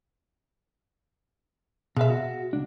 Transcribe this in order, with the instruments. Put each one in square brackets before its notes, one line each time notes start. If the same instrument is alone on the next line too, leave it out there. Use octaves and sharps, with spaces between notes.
[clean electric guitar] B2 F5 [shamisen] G#3 E5
[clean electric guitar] F#4
C#2 D4